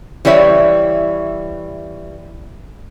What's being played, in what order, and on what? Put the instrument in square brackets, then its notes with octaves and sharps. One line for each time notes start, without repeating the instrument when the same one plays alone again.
[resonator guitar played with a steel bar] E3 G3 E4 C#5 E5